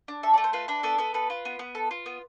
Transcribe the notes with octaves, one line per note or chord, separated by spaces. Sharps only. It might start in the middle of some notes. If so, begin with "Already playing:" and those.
D4
A4 E5
A3 D5
C5
F4 B4
D4 B4
B3 A4
B3 A4
A4 B4
F4
B3
B3
A4
F4
B3